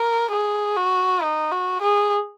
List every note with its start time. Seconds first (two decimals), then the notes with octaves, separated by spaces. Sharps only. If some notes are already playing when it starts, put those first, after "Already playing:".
Already playing: A#4
0.31 G#4
0.76 F#4
1.22 D#4
1.52 F#4
1.81 G#4